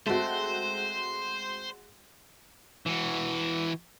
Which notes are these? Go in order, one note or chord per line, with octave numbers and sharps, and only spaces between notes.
G#3 A3 C4 F#4 C5
E3 F#4